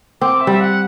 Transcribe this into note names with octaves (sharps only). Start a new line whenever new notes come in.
C4 D6
E5
G3
F#5